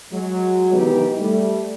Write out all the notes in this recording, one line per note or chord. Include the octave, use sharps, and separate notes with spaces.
F#3 G#3
C3 D#3 E3 B3 D#4 G4
G3 A3